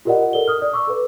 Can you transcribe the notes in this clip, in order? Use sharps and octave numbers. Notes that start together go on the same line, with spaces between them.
F4 G4 A#4 D5 D#5 F#5
A4 A#4 D5 G7
D#6 F6
D5
C#6 D6 E6
A4 B4